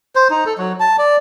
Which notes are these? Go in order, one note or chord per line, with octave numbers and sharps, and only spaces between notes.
C5
D#4
A4
F#3
A5
D5